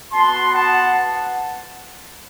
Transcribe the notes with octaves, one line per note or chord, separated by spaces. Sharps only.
B3 F#4 A5 C6
F#5 A5